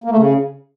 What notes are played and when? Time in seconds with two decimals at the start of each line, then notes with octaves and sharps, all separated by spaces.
0.04 A#3
0.11 A3
0.17 C#3